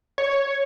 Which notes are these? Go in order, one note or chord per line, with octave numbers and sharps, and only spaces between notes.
C#5